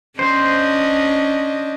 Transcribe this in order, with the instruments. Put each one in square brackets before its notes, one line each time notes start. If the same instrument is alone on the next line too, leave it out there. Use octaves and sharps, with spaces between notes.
[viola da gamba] C#4 D4 D#5 [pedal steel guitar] C5